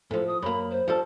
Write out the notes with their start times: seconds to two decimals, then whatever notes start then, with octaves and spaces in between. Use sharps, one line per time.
0.11 A2 F3 A4
0.28 D#6
0.42 F#2 A#3 B5
0.71 C5
0.88 F3 G3 A4